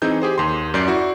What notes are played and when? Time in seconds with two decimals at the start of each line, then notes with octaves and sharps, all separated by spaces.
0.02 E3 C4 D#4 G#4 G6
0.22 G4 G#4 C5
0.38 D#2 C6
0.74 F#2 D5 G6 C7
0.88 E4 F#4 D5